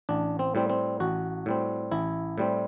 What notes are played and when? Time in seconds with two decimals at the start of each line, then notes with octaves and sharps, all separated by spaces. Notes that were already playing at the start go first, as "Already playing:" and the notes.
0.09 A1 D4
0.39 C4
0.55 A2 G3 C4
0.70 C4
1.00 A1 F#4
1.46 A2 G3 C4
1.92 A1 E4
2.38 A2 G3 C4